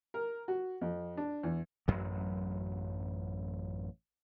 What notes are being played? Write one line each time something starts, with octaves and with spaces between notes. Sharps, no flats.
A#4
F#4
F2
D4
E2
A1 F#2 F#3